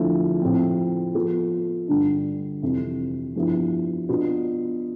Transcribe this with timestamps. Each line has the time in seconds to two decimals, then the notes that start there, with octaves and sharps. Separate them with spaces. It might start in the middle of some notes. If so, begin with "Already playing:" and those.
Already playing: E2 D3 F3 A3 E4
0.42 A2 F3 C4
1.15 F3 B3 F4 A4
1.88 G2 D3 G3
2.62 F2 C3 E3
3.35 G2 F3 B3 E4
4.09 B2 B3 D4 F4